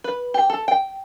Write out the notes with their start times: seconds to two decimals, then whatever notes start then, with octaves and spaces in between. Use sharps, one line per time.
0.04 B4
0.34 G4
0.50 A4
0.68 G5